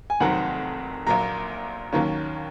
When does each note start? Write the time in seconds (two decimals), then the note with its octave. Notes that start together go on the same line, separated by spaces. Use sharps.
0.10 G#5
0.20 F1 F2 D#3 F#3 C4 F#5
1.07 A#1 A#2 F#3 A#5
1.93 D#2 D#3 F#3 A#3 C#4